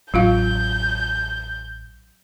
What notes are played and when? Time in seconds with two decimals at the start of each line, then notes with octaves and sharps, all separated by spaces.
0.14 A1 E2 F#3 F4 F5 G6